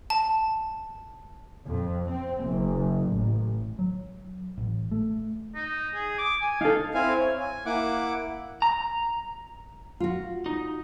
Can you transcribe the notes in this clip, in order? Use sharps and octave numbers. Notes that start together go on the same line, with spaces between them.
A5
F2
C4
F#1
A1
F#3
A1
A3
D#4
G#4
D6
G#5
D#4 A4 F5
C4 E4 F5 G#5
C#5
G#5
A#3 E4 F#5 D6
A#5
F4 F#4
D#4